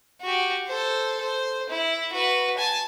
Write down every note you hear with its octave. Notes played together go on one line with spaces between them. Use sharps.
F#4 G4
A4 C5
C5
E4
F#4 B4
G#5 A5